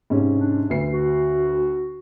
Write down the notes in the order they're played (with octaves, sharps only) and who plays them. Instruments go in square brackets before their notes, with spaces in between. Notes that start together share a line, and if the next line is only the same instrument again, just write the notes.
[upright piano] G#2 C3 C#4
[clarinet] D4
[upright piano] D2 B4 C7
[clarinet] F#4